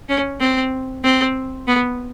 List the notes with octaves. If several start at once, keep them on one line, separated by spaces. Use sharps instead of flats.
C#4
C4
C4
B3